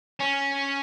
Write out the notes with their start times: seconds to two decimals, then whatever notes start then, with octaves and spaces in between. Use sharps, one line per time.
0.20 C#4